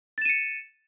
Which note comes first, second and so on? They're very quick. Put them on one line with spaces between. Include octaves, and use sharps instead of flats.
A6 E7 D#7 C#7